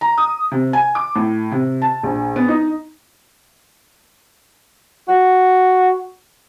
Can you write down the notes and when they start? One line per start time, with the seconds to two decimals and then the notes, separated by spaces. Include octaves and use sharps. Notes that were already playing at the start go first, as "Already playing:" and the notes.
0.01 A#5
0.18 D#6
0.52 C3
0.73 G#5
0.95 D6
1.16 A2
1.52 C3
1.82 A5
2.03 A#1
2.36 B3
2.49 D#4
5.09 F#4